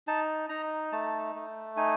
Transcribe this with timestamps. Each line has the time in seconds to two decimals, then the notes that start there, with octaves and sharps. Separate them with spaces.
0.07 D#4 A5
0.49 D#4 A#5
0.92 A3 A5
1.35 A3
1.77 D#4 G#5